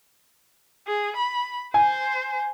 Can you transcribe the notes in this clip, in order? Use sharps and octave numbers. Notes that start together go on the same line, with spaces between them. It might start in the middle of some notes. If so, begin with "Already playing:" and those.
G#4
B5
C5 G#5